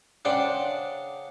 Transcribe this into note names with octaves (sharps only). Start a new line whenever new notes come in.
C#3 D4 C5 D5 F#5 G5